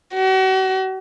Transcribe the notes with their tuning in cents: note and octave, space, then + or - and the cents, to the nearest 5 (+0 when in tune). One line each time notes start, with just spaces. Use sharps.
F#4 +40